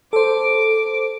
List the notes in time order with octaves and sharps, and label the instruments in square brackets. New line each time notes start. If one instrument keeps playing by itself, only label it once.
[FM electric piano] A4 C5 [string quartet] D6